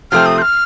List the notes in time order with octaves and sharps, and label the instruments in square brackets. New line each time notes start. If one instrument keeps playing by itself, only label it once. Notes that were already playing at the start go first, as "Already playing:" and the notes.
[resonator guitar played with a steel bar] C3 F3 A3 C4 [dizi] F6
[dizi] D#6
G6
F6